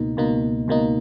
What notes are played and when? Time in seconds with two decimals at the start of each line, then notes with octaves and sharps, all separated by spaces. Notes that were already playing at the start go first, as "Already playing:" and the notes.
Already playing: C#2 B2 A#3 D#4
0.17 C#2 B2 A#3 D#4
0.68 C#2 B2 A#3 D#4